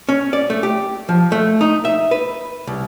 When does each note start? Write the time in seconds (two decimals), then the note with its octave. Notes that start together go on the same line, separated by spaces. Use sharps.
0.09 C#4
0.33 D5
0.50 A3
0.63 G4
1.09 F3
1.32 A3
1.61 D#4
1.85 E5
2.11 B4
2.67 C2